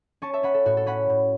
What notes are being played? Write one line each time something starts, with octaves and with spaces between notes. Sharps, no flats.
C#4 A5 C#6
E5 A5
C#4 F#5 B5
A4
A2 F#4
A4
C#4 F#5 B5
A2